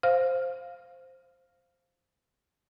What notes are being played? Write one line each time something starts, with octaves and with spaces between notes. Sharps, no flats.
C5 F5 F6